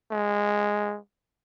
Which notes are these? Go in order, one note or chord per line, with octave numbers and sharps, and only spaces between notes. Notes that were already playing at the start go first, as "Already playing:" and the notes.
G#3